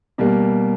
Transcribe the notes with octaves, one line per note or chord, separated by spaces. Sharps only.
B2 G3 A#3